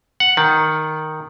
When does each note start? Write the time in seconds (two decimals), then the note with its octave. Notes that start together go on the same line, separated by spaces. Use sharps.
0.20 F#5
0.37 D#3